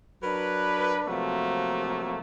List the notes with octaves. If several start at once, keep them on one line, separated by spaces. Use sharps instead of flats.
F#3 D4 A#4 B4
C3 F3 F#3 A3 A#3